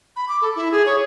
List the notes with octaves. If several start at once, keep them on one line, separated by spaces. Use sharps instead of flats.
B5
D6
A4
E4
G#4
C#5